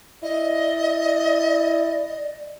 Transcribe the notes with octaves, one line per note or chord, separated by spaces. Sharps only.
E4 D5 D#5